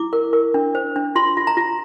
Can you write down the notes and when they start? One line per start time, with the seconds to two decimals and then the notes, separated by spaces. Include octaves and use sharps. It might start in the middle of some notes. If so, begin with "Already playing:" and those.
Already playing: E4 D6
0.13 A#4
0.33 A#4
0.54 D4
0.75 C5
0.96 D4
1.15 F4 C6
1.37 F4
1.47 A#5
1.57 F4